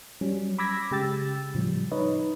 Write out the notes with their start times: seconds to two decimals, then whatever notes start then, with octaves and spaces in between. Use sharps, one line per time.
0.21 F#3 G3 C#4
0.58 B5 D6 E6 G#6 A#6 B6
0.91 C#3 G#3 G4 G5 E6 A6
1.54 A2 C#3 F3 G3
1.91 D#4 B4 C#5 D#5